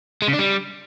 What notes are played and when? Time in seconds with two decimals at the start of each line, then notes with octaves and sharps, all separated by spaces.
0.22 G#3
0.28 C#3
0.33 D4
0.39 G3